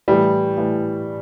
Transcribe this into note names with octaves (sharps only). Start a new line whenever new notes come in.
A2 E3 G3
A2 E3